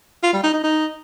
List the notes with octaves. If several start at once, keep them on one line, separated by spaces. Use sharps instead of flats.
F4
G3
D#4
D#4
D#4